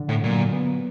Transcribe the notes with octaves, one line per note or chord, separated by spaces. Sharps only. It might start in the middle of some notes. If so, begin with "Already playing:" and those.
Already playing: D3
A2
A#2 F#3
B3